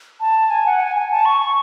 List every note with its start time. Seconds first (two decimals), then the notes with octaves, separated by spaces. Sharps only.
0.20 A5
0.50 G#5
0.66 F#5
0.81 G#5
0.96 G#5
1.11 A5
1.26 C#6
1.41 C#6